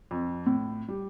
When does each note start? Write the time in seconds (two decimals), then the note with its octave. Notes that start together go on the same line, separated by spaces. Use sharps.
0.11 F2
0.46 A2
0.88 G3